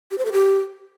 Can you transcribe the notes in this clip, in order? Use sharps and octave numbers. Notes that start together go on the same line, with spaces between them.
G4
C5
A4
G4